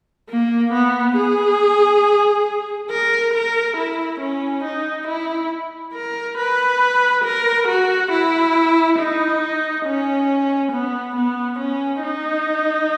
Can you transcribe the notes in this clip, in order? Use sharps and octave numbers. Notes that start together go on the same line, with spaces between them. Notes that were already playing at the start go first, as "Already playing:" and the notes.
A#3
B3
G#4
A#4
A#4
E4
C#4
D#4
E4
A#4
B4
A#4
F#4
E4
D#4
C#4
B3
B3
C#4
D#4